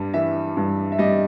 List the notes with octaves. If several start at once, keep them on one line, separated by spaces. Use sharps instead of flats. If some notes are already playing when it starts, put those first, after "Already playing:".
Already playing: G2 G3
E3 E5
G2
E5
G3 D#5